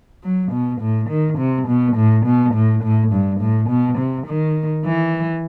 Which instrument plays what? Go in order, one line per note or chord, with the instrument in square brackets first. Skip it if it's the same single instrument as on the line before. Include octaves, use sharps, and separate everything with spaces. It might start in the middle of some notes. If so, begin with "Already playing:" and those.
[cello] F#3
B2
A2
D#3
C3
B2
A2
B2
A2
A2
G2
A2
B2
C3
D#3
E3